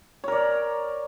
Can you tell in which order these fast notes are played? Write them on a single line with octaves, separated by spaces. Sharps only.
C#5 A#4 D5